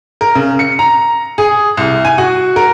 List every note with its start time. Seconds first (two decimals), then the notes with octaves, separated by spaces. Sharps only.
0.21 A#4
0.35 C#3
0.59 C#7
0.79 A#5
1.38 G#4
1.77 C2
2.05 G#5
2.18 F#4
2.56 A#4